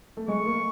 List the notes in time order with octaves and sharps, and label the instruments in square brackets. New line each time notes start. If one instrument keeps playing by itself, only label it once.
[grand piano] A3
[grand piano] G#3 [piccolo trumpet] C#6
[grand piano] A#3